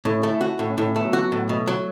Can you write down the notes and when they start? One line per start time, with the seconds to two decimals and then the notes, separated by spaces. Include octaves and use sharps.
0.05 A2 E4
0.18 C#4
0.23 A3
0.30 E4
0.41 F#4
0.59 A2
0.69 C#4
0.78 A2 E4
0.86 C#4
0.96 A3 B3
1.05 F#3
1.13 F#4
1.32 A2
1.49 B2 A3
1.67 F#3